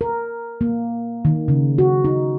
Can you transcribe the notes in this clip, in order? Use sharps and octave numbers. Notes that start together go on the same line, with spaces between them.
A#4
A#3
D#3
C#3
F#4
D#4